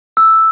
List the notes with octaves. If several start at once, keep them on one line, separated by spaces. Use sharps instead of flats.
E6